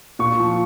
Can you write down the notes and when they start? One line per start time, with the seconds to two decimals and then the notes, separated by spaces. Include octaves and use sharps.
0.19 A#2 C#6
0.40 F3